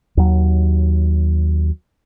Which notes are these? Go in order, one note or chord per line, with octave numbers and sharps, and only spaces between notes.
D#2 F#3